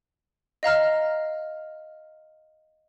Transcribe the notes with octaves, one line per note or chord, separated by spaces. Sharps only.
D#5 F5 A#5 F6